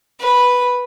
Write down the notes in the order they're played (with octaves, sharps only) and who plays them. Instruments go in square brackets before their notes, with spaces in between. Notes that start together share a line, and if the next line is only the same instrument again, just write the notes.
[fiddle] B4